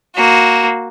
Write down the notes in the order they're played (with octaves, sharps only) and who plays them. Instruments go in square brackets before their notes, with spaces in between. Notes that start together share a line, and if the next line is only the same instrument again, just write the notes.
[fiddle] A#3 F#4